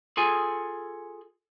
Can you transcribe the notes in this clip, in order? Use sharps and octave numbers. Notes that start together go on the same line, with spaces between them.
F4 G#4 A4 G#5